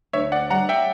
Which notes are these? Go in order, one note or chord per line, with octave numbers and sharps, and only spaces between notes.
D2 C#5 E5
D5 F#5
G3 F#5 A#5
E5 G5